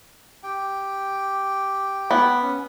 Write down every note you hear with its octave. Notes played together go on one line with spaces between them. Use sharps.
G4 G5
B3
C#4